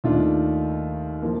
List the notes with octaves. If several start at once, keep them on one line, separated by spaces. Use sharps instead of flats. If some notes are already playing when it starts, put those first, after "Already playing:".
D#2 D#3 A3 D4 F4
F3 A#3